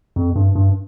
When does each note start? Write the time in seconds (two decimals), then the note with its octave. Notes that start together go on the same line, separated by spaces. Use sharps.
0.16 F2
0.36 G2
0.55 G2